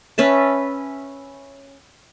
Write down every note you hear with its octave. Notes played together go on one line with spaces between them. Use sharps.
C#4 B4 E5 A5